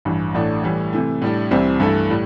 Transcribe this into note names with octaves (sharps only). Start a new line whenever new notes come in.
A1 G2 E3
A1 A2 A3 D4
A2 E3 G3
C3 E3 A3
A2 G3 D4
C2 C3 E3 G3 C4
G2 E3 A3 E4 A4
A2 G3